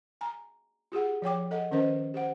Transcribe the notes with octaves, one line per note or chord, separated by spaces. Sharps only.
G#5 A#5
F4 G4 G#4 F#5
F3 C#5 G5 D6
A4 D#5 F#5
D#3 C#4 A#4 C5 D#5
G4 C5 F#5